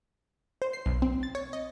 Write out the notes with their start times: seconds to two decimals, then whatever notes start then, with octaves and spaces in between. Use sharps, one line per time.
0.62 C5
0.73 C7
0.86 B1
1.02 C4
1.23 A6
1.35 C#5
1.53 D#5